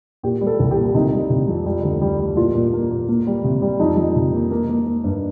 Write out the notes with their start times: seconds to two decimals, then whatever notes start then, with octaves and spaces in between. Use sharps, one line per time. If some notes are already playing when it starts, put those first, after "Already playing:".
0.23 A#2 G4
0.41 G3
0.47 A4
0.59 C2
0.71 G4
0.77 A#2
0.94 C3 D#4
1.12 G3
1.30 C3
1.48 F2
1.66 G3
1.84 D2
2.01 G3
2.19 G3
2.37 A#2 F4
2.54 A#2
2.73 A#3
2.91 A#2
3.09 A#3
3.27 G3
3.44 C3
3.62 G3
3.80 F2 D#4
3.97 F2
4.16 C3
4.33 A#3
4.51 A#3
4.69 A#3
4.86 A#3
5.04 G2